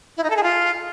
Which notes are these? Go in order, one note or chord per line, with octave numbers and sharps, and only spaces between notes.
E4
D#4
A4
G#4
F4